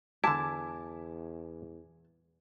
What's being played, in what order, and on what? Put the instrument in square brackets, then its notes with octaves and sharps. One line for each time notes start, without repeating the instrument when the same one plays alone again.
[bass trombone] E2 [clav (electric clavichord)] D3 E4 [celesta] G#5 D6 G#6 [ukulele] A5